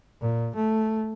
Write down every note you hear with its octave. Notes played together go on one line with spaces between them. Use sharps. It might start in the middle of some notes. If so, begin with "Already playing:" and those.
A#2
A3